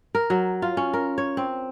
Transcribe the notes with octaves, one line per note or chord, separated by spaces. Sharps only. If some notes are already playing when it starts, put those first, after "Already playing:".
A#4
F#3
F4
C#4
A#4
C#5
C4